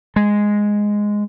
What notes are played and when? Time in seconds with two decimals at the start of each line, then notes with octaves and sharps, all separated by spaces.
0.16 G#3